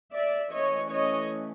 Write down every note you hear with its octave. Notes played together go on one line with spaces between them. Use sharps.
D5 E5
E3 A3 C#4 C#5 D#5
C#5 D#5